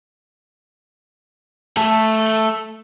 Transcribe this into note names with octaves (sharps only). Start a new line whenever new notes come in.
A3 A4